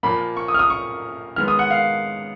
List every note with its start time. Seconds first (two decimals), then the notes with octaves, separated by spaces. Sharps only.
0.03 A#2 F3 A#3 B5
0.37 C#6
0.48 D#6
0.54 F6
0.59 D#6
0.70 C#6
1.36 D#3 G#3 B3 F6
1.48 D#6
1.59 F#5
1.71 F5